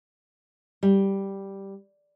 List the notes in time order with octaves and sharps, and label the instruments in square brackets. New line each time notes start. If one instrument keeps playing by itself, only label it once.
[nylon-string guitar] G3